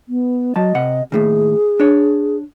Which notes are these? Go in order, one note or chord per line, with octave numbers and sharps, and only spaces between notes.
B3
F#3 D#5 A5
C3 F#5
D#2 A2 C#3 G#4
D4 C#5